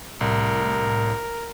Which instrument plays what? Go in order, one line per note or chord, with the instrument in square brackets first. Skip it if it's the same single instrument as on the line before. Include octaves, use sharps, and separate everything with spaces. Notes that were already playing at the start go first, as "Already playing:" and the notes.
[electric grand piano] C2 [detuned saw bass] A2 [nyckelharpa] A#4